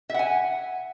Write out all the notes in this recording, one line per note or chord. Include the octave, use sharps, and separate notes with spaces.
E5 F#5 G#5